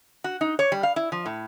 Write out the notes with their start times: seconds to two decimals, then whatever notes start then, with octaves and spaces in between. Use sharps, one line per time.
0.24 F#4
0.41 D#4
0.59 C#5
0.72 G3
0.83 F5
0.96 E4
1.12 F3
1.26 A2